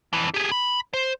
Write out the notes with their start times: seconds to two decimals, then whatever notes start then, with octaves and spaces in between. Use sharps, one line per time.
0.13 F2 E3
0.34 G4 G#4
0.52 B5
0.94 C5